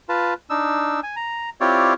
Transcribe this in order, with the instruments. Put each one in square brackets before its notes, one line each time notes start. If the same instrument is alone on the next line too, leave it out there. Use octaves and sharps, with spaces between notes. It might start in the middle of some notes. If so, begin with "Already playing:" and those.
[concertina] F4 B4 A5
D4 D#4 E6
G#5
A#5
C4 E4 F4 G4 C#5 D5